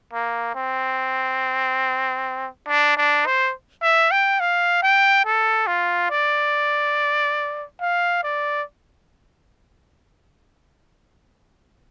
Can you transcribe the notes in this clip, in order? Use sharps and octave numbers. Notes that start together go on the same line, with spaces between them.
A#3
C4
D4
D4
C5
E5
G5
F5
G5
A4
F4
D5
F5
D5